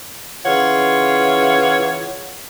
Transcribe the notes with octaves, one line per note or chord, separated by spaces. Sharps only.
C#3 E3 F4 C#5 F#5